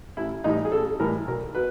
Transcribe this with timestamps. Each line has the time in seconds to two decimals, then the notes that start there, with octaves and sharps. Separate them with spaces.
0.17 A1 E4
0.44 A2 E3 G3 D#4
0.65 G#4
0.72 A1 A4
1.00 A2 E3 G3 A#4
1.27 B1 A#4
1.55 B2 F#3 B4